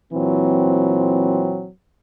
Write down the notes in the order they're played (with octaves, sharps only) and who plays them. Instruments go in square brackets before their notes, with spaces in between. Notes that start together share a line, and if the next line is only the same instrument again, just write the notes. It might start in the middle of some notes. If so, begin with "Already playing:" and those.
[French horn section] A#2 E3 F#3 C4